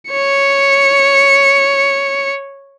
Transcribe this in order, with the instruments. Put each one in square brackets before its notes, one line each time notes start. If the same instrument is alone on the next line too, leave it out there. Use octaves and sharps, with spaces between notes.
[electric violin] C#5 C#7